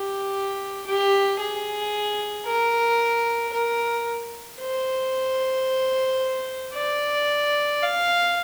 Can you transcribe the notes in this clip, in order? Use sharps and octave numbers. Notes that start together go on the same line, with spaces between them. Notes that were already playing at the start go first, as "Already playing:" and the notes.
Already playing: G4
G4
G#4
A#4
A#4
C5
D5
F5